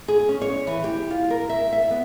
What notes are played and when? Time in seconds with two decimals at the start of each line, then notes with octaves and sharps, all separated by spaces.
0.08 G#4
0.29 C#4
0.42 C#5
0.67 E3
0.84 G4
1.10 F4
1.30 A#4
1.49 E5
1.73 E5
1.91 B3